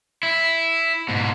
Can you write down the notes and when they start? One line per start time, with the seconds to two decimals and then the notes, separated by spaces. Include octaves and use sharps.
0.23 E4
1.09 G#2 B2